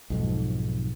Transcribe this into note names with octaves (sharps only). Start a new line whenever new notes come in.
B1 F2 G#2